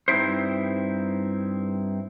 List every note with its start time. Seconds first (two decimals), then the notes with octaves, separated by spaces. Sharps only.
0.08 G2 C4 D#4 E4 C5